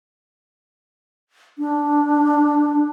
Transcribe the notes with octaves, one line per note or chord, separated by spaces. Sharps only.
D4